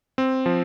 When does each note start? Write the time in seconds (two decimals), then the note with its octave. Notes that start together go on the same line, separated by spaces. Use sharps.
0.18 C4
0.46 F3